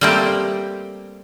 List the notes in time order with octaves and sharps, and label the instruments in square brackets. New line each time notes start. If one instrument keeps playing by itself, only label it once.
[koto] G3 A3 A#3 C4 G4